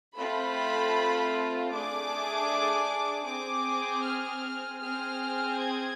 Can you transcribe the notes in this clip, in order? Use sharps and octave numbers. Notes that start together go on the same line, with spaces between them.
A3 C4 F4 A4 B5
A3 D4 G#4 D6
C4 G#4 D6
F6
C4 G#4 F6
G#6